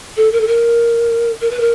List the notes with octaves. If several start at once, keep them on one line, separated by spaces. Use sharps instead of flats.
A4
A#4
A4
A#4
A#4
B4
A#4